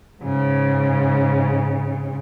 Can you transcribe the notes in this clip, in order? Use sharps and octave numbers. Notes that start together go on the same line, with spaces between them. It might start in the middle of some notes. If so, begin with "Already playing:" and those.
G#2 C#3